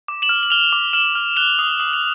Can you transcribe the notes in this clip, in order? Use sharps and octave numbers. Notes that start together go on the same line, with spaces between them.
D6
E7 F#7
F6
F#7
F6 F7 G7
D6
F6 E7 F#7
F6
F#6 F7 G7
D#6
D#6 F#7
F7